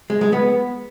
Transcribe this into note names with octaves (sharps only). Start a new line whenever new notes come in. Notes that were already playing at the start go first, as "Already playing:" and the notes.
G#3
G#3
B3